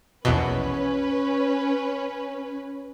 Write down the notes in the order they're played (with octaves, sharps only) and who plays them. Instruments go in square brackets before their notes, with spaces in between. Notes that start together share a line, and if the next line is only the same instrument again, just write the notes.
[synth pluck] A#1 E2 B2 [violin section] C#4 B4